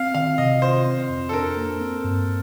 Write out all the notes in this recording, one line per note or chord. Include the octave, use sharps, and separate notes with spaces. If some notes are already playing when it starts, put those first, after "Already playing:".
Already playing: C4 F5
D#3 F5
C3 D#5
F4 C5
C4
F2
A4
D4 A#4
A#3
C4
G2